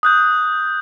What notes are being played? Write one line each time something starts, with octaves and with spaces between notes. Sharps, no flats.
D#6 F#6 G6